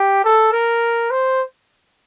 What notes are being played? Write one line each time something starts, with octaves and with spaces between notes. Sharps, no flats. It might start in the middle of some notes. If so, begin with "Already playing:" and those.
Already playing: G4
A4
A#4
C5